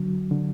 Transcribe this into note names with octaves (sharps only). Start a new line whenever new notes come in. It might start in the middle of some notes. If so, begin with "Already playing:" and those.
Already playing: D3 F#3
D3